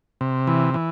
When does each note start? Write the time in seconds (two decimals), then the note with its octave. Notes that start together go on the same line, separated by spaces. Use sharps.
0.21 C3
0.47 E3
0.74 E3